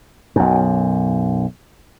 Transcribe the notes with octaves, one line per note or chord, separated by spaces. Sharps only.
B1 F#2